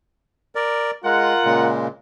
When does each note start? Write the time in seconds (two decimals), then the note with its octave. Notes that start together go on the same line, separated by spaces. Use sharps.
0.55 A#4 D5
1.04 G#3 F4 A#4 F#5
1.45 A#2 C#3 G#3